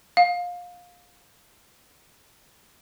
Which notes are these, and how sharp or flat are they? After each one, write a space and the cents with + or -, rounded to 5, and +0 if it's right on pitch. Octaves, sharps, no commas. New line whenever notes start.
F5 +20